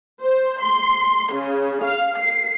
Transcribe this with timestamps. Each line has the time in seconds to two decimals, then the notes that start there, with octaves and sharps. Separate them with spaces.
0.21 C5
0.60 C6
1.33 C#3
1.84 F5
2.19 C7